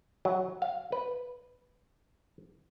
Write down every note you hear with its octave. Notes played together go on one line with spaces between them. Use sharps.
F#3
F5
B4